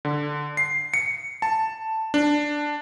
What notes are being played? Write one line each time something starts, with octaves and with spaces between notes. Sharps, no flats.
D3
C7
C#7
A5
D4